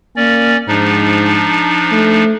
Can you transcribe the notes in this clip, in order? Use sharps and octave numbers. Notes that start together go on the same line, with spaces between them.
A#3 C#4 D5
G#2 F3 D4 D#4
A3